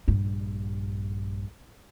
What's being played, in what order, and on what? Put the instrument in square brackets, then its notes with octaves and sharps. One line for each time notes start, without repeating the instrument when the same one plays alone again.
[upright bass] A#1 G2